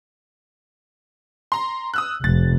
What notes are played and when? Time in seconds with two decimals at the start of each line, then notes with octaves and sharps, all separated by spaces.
1.52 A#5 C6
1.94 D#6 E6 F#6
2.24 F1 A6